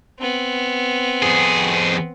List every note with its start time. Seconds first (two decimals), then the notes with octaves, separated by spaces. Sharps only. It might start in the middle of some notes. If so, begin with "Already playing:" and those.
0.19 B3 C4
1.23 F2 G#4